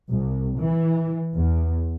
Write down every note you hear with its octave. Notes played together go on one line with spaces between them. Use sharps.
C2
E3
E2